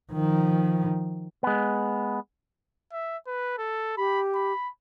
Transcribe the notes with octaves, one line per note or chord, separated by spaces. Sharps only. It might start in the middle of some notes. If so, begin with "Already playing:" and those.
D#3 F3
G#3 B3
E5
B4
A4
G4 B5
B5